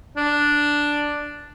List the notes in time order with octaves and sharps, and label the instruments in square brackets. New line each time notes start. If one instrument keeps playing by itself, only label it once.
[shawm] D4